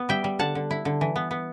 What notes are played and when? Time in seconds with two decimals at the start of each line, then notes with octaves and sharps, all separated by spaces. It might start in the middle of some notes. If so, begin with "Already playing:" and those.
Already playing: B3
0.09 G3 E5 G5
0.24 G3
0.39 D3 F#5 A5
0.55 D3
0.71 E4
0.85 D3
1.01 E3
1.16 B3
1.31 B3